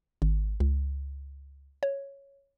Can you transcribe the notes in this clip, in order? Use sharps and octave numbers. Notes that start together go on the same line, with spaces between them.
G#1
C#2
C#5